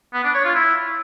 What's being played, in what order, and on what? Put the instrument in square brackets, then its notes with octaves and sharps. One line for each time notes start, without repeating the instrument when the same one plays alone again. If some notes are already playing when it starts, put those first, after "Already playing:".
[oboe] B3
D4
C#5
F4
E4